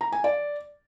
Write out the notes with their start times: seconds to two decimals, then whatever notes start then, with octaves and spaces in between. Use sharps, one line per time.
0.01 A#5
0.12 G#5
0.24 D5